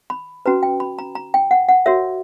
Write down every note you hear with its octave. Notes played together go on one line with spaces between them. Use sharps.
B5
C#4 F#4 B4 A#5
G5
B5
A#5
A#5
G5
F#5
F#5
F#4 A#4 C#5 E5